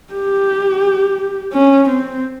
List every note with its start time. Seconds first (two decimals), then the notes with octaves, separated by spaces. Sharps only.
0.13 G4
1.53 C#4
1.89 C4